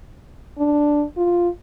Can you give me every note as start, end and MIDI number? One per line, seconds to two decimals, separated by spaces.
0.58 1.04 62
1.17 1.49 65